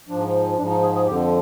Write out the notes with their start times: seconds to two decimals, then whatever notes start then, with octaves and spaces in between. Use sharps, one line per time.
0.09 G#2 F3 D4
0.58 G#2 F3 D4
0.70 D#4
0.83 G#4
0.95 G#4
1.07 F2 D3 F3 G4